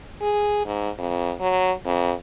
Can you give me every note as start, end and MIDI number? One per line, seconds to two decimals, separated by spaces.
0.21 0.64 68
0.66 0.90 44
0.98 1.33 41
1.40 1.72 54
1.86 2.12 41